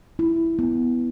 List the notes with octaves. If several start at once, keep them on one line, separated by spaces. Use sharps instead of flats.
E4
B3